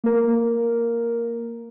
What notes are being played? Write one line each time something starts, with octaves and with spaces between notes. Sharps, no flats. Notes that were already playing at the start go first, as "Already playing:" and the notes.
A#3 A#4